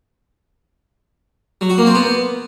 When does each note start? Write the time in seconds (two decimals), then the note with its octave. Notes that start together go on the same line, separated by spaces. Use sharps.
1.61 F#3
1.70 F#4
1.78 A#3
1.86 C4
1.95 B3